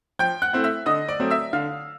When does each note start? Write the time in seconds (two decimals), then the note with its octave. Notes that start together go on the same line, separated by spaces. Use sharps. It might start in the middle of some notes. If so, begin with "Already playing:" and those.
0.19 F3 G5 G6
0.42 F#5 F#6
0.53 A3 C4 E4
0.64 E5 E6
0.86 D3 D#5 D#6
1.08 D5 D6
1.20 F#3 A3 C4
1.31 E5 E6
1.53 D3 F5 F6